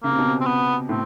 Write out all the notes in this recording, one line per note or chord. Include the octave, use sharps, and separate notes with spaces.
C#3 A#3
C3
B2
C3
C4
B3
A2 C4